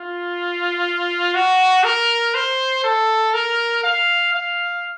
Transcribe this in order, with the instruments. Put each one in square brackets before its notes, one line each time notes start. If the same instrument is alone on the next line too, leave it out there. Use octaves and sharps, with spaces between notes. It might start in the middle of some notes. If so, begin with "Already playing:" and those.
Already playing: [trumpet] F4
F#4
A#4
C5
A4
A#4
F5
F5